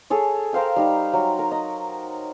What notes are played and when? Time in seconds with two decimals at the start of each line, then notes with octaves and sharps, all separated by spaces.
0.10 G#4 A4 C#5
0.53 A#4 C5 F5 G5
0.76 G3 D#4
1.13 F#3
1.39 A#4
1.51 D#5